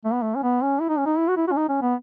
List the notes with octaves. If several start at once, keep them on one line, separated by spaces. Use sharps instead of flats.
A3
B3
A3
C#4
B3
C#4
E4
D#4
C#4
D#4
E4
F#4
E4
F#4
C#4
D#4
C#4
B3